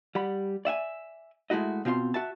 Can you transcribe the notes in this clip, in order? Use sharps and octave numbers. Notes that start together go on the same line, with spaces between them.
G3 F#5 B5
D5 E5 F#5 G#5
G#3 A3 E4 F#4 D#5
B2 C4 F4 E5 C6
F#4 E5 A5